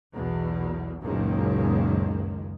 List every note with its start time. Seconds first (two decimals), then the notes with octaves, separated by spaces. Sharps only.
0.14 B1 E2 B2
1.01 F#1 C#2 F#2 A#2 D#3 G#3